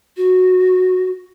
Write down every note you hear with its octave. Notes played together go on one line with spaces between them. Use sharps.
F#4